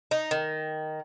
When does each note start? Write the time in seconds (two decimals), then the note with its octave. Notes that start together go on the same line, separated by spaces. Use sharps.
0.11 D#4
0.31 D#3